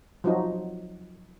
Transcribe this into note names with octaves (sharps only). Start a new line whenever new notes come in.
F3 F#3 D#4